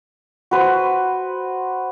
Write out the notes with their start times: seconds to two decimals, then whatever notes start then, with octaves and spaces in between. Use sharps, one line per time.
0.51 F#4 B4 C5